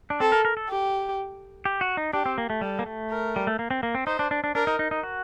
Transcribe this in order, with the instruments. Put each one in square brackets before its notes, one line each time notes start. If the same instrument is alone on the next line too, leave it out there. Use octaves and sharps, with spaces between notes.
[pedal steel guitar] D4
[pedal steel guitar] C4 [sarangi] A4
[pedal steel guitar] A#4
A#4
A4
[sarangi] G4
[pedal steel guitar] G4
F#4
D#4
[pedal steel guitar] D4 [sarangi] G4
[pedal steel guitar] C4
A#3
A3
[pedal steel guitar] G3 [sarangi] A4
[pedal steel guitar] A#3
A3
[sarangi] A#4
[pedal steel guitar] G3
A3
A#3
C4
A#3
C4
[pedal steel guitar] D#4 [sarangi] C5
[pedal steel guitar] D4
D4
D4
[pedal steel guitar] D4 [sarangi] A#4
[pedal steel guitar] D#4
D#4
D#4
F#4